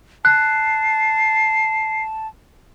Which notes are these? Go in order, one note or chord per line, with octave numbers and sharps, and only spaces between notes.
A5 F#6 C7